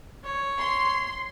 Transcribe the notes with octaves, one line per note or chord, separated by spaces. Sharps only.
C#5
C6